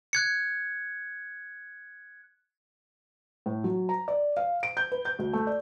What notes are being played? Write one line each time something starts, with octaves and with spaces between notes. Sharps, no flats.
F#6 G#6 C#7
A2
F#3
A#5
D5
F5
D7
G6
B4
G6
D2
A3
D5